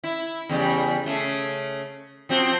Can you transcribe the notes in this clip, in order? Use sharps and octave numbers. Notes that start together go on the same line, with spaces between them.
E4
E2 C#3 G3
C#3 A3
F3 C4 F#4